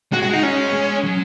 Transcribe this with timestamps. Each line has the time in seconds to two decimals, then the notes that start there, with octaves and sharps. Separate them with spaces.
0.12 G#3 F#4
0.22 F#4
0.28 G#3
0.33 D#4
0.43 C#4
0.67 B3
0.73 G#3
1.04 F#3